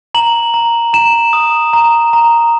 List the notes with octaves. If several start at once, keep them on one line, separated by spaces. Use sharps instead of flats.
A#5 F#7
A#5
A#5 E7
D#6
A#5
A#5